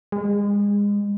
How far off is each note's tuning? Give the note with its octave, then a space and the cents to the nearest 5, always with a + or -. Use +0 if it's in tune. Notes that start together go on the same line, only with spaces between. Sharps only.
G#3 -30